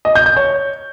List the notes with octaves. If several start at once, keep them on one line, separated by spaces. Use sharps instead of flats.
D#5
G6
G6
C#5